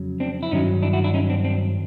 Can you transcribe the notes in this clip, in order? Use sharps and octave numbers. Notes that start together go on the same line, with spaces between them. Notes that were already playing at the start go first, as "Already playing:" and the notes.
Already playing: F2 C#3 F#3
C4 D4
E4
G2 D#3 F#3 C#4 D#4
D4 E4
E4 F#4
D4 E4
C#4 D#4
C4 D4
C4 D4